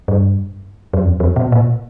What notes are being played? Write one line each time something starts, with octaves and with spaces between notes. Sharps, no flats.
G2
F#2
F2
F2
B2
A#2